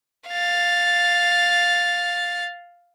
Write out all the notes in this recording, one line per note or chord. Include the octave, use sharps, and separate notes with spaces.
F5 A6